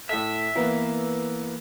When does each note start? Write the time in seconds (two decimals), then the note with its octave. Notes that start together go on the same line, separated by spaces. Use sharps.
0.09 A2 A4 E5
0.55 E3 A#3 B3